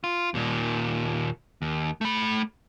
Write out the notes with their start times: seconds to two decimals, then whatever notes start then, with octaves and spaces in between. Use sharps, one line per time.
0.04 F4
0.34 D#2 A#2
1.62 D#2
2.01 A3 B5